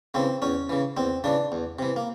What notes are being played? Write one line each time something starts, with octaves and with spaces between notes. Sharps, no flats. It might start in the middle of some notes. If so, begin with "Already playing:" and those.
C#3 E3 C4
E2 C#4
C#3 E3
E2 C4
C#3 E3 D4
E2
C3 E3
A#3